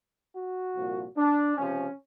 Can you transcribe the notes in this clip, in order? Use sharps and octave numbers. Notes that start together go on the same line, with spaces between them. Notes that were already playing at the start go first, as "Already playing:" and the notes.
F#4
C2 A#2 F3
D4
C#2 C3 F3 C#4